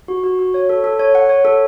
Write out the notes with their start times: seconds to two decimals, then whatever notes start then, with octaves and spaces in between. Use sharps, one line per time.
0.08 F#4
0.24 F#4
0.39 F#4
0.54 C#5
0.69 A4
0.84 A4
1.00 C#5
1.15 F#5
1.29 C#5
1.45 A4